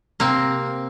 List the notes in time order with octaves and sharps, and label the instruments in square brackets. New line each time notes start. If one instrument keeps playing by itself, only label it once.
[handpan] C3 [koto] A#3 C4